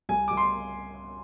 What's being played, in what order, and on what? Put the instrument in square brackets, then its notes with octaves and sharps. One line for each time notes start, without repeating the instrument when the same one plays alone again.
[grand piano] C2 G#5
C2 D6
C6